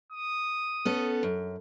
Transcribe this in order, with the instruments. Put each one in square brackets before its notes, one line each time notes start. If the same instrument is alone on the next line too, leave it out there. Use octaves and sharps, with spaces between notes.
[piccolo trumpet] D#6
[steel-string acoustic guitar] B3 C#4 A4
F#2